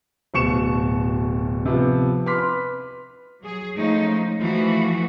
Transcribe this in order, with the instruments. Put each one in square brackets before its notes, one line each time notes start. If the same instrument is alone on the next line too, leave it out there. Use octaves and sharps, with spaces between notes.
[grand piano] D1 B2 C#6 C#7 E7
C3 F3 B3
B4 C6 D6 F6 B6
B4
[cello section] F#3 G#4
F3 G#3 A3 C#4 D#4
E3 F3 A3 F#4